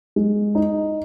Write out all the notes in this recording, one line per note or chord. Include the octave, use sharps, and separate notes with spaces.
G#3
D#4